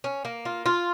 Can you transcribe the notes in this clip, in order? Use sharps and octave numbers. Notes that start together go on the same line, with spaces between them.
C#4
A#3
F4
F4